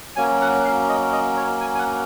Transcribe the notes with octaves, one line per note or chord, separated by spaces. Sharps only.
F#3 A#3 C#4 G#5
F#5
F5
D#5
D#5
C#5
G#5
G#5
F#5